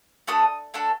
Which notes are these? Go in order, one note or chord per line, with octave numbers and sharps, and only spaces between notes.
A3 D4 F#4 A4 D#6
A3 D4 F#4 A4